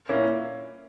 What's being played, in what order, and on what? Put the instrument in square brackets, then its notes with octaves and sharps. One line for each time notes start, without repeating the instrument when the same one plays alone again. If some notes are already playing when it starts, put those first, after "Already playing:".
[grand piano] A#2 A#3 C#4 E4